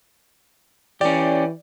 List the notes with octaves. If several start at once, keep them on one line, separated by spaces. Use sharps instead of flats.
E3 C#4 G4 D5